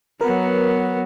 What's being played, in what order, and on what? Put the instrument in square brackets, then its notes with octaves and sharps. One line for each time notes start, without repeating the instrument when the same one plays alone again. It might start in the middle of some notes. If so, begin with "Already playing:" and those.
[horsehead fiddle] F#3 B3 [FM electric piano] A#4 B4